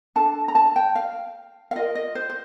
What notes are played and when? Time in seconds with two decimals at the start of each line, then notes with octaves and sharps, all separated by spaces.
0.16 D4 A4 A5
0.48 A#5
0.55 A5
0.76 G5
0.95 F5
1.71 F5
1.76 F4 A#4 D#5
1.95 D#5
2.15 C5
2.30 C5